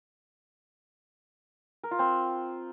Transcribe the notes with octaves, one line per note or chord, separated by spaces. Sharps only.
A#4
F4
C4